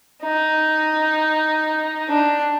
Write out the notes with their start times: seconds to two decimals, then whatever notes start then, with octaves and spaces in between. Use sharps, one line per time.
0.23 D#4
2.09 D4